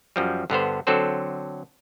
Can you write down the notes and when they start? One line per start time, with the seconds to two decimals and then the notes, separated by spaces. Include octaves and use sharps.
0.16 F#2 F3 G3
0.50 G2 D3 B3 C5
0.87 D3 F#3 C4 A4 C5